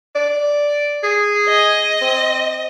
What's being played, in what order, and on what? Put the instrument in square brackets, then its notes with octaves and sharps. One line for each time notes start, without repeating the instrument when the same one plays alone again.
[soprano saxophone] D5
G#4
[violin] D#5
[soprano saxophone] C4